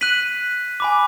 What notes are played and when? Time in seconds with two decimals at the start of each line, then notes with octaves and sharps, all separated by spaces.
0.01 F#6 B6 D#7 F#7
0.80 G#5 B5 D6